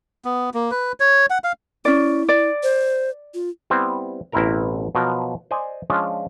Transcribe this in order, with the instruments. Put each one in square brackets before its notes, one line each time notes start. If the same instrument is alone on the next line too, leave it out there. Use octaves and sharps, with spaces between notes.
[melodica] B3
A#3
B4
C#5
F#5
F5
[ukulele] C#4 D5 [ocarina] E4
[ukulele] D5
[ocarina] C5
F4
[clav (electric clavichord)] G3 B3 C4 E4
A1 B2 C4 E4 A#4 A#5
B2 F3 F#3 A#4
C5 D5 D#5 G#5
F3 G#3 C#4 D4 F4